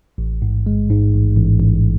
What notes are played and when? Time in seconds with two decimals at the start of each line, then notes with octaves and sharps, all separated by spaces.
0.18 A1
0.42 G#2
0.66 G#3
0.90 G#2
1.14 A1
1.36 A1
1.60 A1